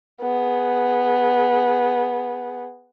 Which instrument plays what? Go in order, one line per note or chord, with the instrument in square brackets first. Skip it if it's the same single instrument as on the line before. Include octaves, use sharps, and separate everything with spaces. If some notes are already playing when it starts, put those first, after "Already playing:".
[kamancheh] B3 G#4